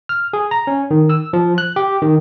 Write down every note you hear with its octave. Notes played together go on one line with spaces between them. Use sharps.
F6
G#4
A#5
C#4
D#3
E6
F3
F#6
G4
D#3